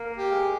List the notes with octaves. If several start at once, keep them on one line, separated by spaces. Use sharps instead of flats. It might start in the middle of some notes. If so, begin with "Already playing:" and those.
Already playing: A#3
G4
G#3